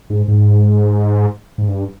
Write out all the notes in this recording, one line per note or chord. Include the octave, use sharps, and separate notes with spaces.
G#2
G#2
G#2
G2